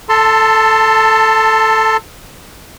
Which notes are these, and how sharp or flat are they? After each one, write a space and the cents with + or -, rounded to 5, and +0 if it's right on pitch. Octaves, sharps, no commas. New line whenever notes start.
A4 +0 A5 +25 C6 +0